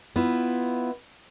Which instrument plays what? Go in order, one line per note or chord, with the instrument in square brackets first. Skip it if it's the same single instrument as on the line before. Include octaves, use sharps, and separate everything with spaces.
[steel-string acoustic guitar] B3 E4 F4